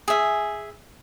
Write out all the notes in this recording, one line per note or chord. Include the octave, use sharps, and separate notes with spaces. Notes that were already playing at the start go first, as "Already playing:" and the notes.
G#4 E5